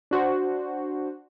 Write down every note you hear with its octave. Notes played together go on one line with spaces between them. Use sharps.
D4 F#4 C5